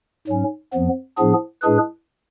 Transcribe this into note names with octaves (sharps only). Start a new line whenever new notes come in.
G#2 F#3 C#4
F2 F3 B3
A2 F3 B3 D4 G#4
A2 G#3 D4 G#4 B4